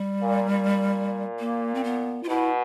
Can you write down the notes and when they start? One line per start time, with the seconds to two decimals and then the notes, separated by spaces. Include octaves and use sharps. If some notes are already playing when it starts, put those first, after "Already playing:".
Already playing: G3
0.20 A#2
0.51 A#2
1.39 A#3
1.75 C4
1.84 B3
2.23 F4
2.29 B2 E4